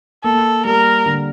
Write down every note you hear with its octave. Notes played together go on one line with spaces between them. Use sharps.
A#3 A4
G3 A#4
D3